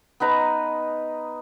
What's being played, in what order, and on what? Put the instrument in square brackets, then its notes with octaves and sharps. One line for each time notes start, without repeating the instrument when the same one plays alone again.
[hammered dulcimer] B3 D#4 B4 A#5